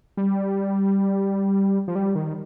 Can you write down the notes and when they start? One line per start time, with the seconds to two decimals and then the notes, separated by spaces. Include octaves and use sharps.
0.17 G3
1.88 F3
1.95 G3
2.15 D#3